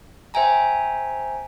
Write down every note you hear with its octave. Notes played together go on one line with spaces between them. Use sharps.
C5 E5 G5 G#5 A#5